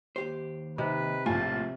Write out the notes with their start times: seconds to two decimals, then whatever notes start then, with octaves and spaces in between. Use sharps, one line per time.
0.16 D#2 G4 C5
0.78 C3 D#4 B4
1.26 A#1 A2 A3 F4 G#5 A5